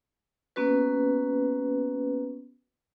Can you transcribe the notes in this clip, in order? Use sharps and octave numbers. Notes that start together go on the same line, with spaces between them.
A#3 B3 C#4 F#4 B4